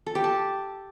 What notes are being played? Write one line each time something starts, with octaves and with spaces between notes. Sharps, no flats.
A4
G4
A5